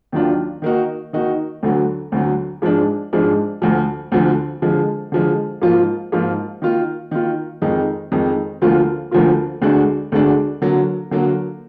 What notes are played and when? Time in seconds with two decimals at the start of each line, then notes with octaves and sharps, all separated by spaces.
0.12 D#2 D#3 F#3 D4 F4
0.62 D#3 A#3 D#4 F#4
1.13 D#3 A#3 D#4 F#4
1.63 D2 D3 F#3
2.12 D2 D3 F#3
2.62 G#2 F3 G#3 D4
3.13 G#2 F3 G#3 D4
3.62 D2 D3 F3
4.12 D2 D3 F3
4.62 D3 F3 G#3
5.12 D3 F3 G#3
5.62 G#2 F3 A#3 F4
6.12 G#2 F3 A#3 F4
6.62 D#3 A#3 F4
7.11 D#3 A#3 F4
7.62 F2 D#3 G#3 D#4
8.12 F2 D#3 G#3 D#4
8.62 D2 D3 F3 A#3 F4
9.11 D2 D3 F3 A#3 F4
9.62 D2 D3 G#3 D4 F#4
10.12 D2 D3 G#3 D4 F#4
10.62 D3 F#3 A#3
11.11 D3 F#3 A#3